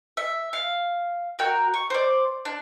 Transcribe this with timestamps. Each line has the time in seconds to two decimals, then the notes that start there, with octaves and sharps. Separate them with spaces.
0.17 E5
0.53 F5
1.39 F#4 A#4 G5
1.74 C#6
1.90 C5 D5
2.45 D4